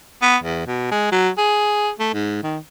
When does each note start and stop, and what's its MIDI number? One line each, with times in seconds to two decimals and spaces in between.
0.22 0.37 59
0.43 0.64 40
0.67 0.88 47
0.91 1.07 56
1.12 1.30 54
1.38 1.91 68
1.99 2.11 57
2.14 2.39 44
2.43 2.58 51